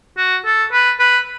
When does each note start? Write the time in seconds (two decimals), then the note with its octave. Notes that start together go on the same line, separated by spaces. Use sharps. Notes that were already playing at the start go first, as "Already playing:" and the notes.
0.17 F#4
0.45 A4
0.73 B4
0.99 B4